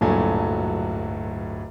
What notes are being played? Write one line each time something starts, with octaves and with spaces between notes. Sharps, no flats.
D1 G2 A#2 F#3 A3 G#5